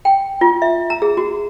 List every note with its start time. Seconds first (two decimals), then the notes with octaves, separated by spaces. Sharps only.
0.05 G5
0.41 F4
0.62 E5
0.90 A#5
1.02 G#4
1.17 F#4